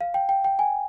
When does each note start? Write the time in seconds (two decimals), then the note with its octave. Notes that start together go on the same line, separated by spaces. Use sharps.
0.01 F5
0.14 G5
0.29 G5
0.44 G5
0.59 G#5